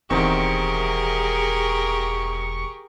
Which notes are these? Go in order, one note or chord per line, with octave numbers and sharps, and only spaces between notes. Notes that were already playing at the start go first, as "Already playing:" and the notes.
E1 E2 D#3 C4 G4 G#4 A#4 C#6